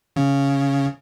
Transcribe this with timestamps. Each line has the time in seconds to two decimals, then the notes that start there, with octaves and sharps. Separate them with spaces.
0.16 C#3